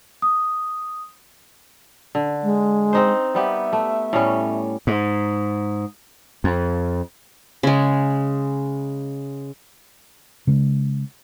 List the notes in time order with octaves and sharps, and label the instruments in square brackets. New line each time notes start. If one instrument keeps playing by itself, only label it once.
[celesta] D#6
[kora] D3
[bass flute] G#3
[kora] C4 D#4 C5
[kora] G3 B3 G4 [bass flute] E5
[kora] A3
A2 G3 C#4
[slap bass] G#2
F2
[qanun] C#3 G#3
[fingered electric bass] C#3 G#3 A3 C#4